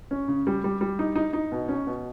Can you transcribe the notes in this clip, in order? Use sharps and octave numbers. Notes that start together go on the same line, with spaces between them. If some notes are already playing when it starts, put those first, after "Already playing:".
C#4
C#3
G3
G3
G3
D#4
D#4
D#4
B2
C#4
B2